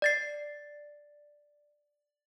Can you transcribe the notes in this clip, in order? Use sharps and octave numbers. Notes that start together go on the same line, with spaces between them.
D5 A6 C7